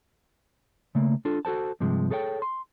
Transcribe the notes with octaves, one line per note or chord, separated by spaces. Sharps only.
C#3 A3 A#3
D4 F4 A4
F#4 A4 C5 A5
G2 C3 F3 G#3
G#4 A4 C#5 D5 G5
C6